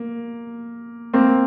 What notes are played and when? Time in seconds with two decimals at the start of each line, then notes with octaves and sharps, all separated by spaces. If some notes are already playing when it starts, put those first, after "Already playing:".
Already playing: A#3
1.14 A#3 C4